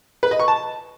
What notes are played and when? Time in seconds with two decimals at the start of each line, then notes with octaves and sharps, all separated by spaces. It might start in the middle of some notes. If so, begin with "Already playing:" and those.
0.23 B4
0.31 D#5
0.40 C#6
0.48 A5